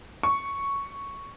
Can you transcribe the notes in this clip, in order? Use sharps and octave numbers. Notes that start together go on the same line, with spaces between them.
C#6